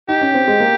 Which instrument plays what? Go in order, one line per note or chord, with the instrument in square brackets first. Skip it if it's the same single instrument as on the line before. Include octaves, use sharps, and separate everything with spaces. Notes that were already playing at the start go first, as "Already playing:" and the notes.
[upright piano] D#4 [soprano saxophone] G4
[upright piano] C#4
C4
G#3
A#3